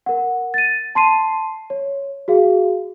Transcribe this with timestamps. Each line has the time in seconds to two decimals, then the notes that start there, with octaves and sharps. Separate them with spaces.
0.06 A#4 F#5
0.54 A6 D#7
0.95 A5 C6 C7 D#7
1.70 C#5
2.28 F#4 G#4 F5